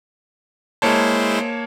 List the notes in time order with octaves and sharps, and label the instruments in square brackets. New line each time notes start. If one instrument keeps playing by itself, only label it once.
[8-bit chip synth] G#3 E4 C5 [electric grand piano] A#3 C#5 A5